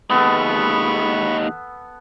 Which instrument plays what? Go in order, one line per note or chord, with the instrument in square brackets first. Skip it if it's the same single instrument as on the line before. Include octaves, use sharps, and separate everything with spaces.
[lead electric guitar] D#2 G#3 [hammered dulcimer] B3 A4 [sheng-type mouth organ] B5 C#6